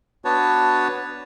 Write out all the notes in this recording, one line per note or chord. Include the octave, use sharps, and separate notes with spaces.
B3 D4 F#4 B4 C#5 A5